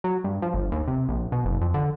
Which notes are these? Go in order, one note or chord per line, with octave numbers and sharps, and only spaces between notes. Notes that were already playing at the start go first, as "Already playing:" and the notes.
F#3
G2
F3
G1
D#2
C3
A#1
B2
F#1
F2
D3